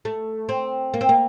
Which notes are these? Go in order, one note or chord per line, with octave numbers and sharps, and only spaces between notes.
A3
C4
A#3
C4
A#3